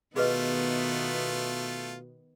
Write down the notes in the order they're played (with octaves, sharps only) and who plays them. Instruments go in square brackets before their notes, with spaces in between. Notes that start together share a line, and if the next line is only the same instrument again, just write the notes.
[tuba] B2 [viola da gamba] D#3 B3 [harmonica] A3 F4 [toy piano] G#4 B4 D#5